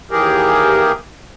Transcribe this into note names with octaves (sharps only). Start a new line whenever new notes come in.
D#2 E3 G4 G#4 A#4